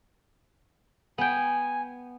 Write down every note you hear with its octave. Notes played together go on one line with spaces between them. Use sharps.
B3 G5 G#5